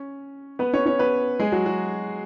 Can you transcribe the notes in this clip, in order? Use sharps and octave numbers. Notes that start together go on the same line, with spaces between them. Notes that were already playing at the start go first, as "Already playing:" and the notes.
Already playing: C#4
B3 B4
C#4 C#5
C#4 C#5
B3 B4
G#3 G#4
F#3 F#4
F#3 F#4